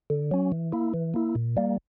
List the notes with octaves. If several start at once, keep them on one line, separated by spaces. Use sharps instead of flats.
D3
F#3 C#4
E3
A#3 E4
E3
A#3 E4
A#2
G3 A#3